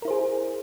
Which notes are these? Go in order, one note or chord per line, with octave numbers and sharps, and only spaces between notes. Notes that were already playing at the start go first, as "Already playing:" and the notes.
E4 G#4 A#4 C5